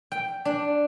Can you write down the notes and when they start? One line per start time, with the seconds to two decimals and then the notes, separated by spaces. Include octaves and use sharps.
0.12 G5
0.45 D4